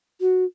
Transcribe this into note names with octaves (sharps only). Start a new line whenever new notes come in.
F#4